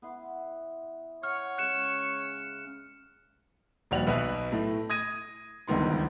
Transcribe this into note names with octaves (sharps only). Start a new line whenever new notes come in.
B3 E4 C6
C#5 F#5 F6
C#3 G#3 C#4 F#6 C#7 E7
D#1 A#1 G3 F#4 F7 F#7
B1 B2 B4 E5
A2 A3
D#6 G#6 A#6 D#7
D1 C#2 G2 D#3 B3 C6